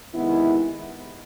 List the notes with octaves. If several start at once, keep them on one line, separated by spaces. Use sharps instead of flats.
C3 D#3 G#3 B3 E4